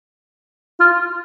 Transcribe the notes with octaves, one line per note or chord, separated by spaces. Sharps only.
F4